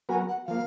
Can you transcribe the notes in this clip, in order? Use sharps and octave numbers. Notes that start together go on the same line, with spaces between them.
F#3 B3 F#4 A#4 G#5
F#5
F3 A#3 F5